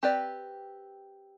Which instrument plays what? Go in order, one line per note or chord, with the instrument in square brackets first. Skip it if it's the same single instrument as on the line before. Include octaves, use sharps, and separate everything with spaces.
[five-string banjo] C4 G4 B4 D5